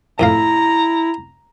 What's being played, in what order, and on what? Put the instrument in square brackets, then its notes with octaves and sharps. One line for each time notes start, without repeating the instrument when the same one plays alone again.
[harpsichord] F2 A2 F5 [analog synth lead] E4 [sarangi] A#5